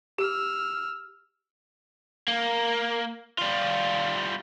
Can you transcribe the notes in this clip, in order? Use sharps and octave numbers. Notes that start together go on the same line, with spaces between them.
G4 E6 F6
A#3
G3 F4